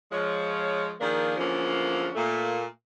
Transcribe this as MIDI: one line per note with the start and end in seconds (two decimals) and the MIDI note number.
0.11 0.92 53
0.11 0.92 56
0.11 0.92 73
0.99 1.37 51
0.99 1.37 53
0.99 1.37 58
0.99 1.37 62
0.99 1.37 68
0.99 1.37 70
1.38 2.09 40
1.38 2.09 50
1.38 2.09 53
1.38 2.09 58
1.38 2.09 61
2.15 2.63 46
2.15 2.63 57
2.15 2.63 58